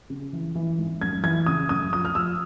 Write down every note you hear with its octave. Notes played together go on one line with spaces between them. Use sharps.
C#3
E3
E3
G#1
F#2 G#6
E3 G#6
C#3 D#6
F#2 D#6
F3 D#6
F6
F3 E6